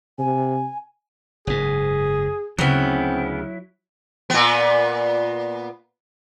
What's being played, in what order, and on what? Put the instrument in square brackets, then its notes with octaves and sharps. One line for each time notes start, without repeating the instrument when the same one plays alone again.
[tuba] C3 [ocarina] G#5
[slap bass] F#1 G#2 [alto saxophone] G#4
[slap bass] D2 [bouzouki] C#3 B3 [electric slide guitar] F#3 E4 [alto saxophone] C4
[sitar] A#2 B3